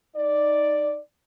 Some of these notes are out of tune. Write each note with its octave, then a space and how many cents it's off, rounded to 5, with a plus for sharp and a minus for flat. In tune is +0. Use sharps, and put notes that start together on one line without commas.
D#4 +0 D5 +0